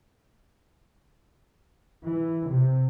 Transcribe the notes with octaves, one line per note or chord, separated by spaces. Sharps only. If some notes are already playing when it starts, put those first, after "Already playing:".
E3
C3